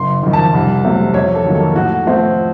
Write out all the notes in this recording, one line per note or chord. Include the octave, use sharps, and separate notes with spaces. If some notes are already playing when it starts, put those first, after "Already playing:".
Already playing: F#1 C6
F2 D#3
A5
C2
C3 F#3 A3
F2 C#5
A4
D#3 F#3 A#3
A4
A2 F#4
F3 A3 C4